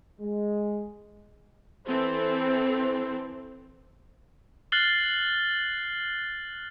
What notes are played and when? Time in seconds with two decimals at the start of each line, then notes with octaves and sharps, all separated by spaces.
0.20 G#3
1.87 E3 C4 A4 C5
4.72 F6 F#6 A6 C7 F#7 G7